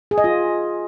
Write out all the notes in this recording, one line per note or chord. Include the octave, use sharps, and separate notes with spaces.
G#4
D#5
F4